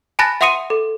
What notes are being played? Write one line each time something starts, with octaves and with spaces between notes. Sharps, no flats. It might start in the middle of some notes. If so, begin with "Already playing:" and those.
G#5 A5 B5 F#6 A6 A#6
E5 F#5 C6 D#6 C#7 D#7
A4